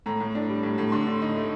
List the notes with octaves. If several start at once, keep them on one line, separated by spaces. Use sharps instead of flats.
A2 A#5
A2
D4
G3
A2
A2
D3 C6
D3
D#4
A3